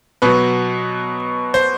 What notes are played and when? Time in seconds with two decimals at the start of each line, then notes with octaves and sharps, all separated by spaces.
0.22 B2 F#3 B4
1.54 C5